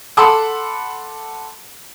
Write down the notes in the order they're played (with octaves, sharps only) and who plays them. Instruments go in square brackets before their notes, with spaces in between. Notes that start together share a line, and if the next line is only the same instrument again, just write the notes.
[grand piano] A4 F#5 B5 C6 D6 E6